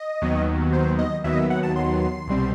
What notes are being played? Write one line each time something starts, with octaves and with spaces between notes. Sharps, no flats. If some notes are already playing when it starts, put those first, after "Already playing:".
Already playing: D#5
D#2 D#3 F#3 B3
C5
D#5
D#2 D#3 F#3 B3 E5
D#5
E5
F#5
A5
C6
C2 B2 G3 C4